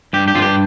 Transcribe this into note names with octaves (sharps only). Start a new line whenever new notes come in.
G2 G4
G4
G2 F4
G4